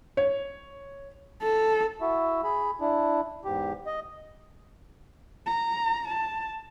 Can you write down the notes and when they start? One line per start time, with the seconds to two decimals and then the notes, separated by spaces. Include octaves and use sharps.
0.17 C#5
1.42 A4
2.01 E4 F#4 E5
2.44 G#4 B5
2.80 D4 E4
3.45 E2 G#2 G4
3.86 D#5
5.46 A#5
6.08 A5